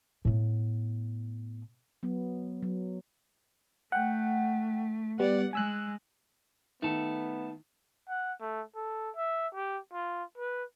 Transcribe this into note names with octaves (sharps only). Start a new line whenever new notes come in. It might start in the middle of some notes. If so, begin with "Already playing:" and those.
A2 B3
F#3 B3
F#3
A3 F#5 G5
G3 B3 D5 F#5
G#3 G#5 E6 F#6
D#3 A3 B3 A4
F#5
A3
A4
E5
G4
F4
B4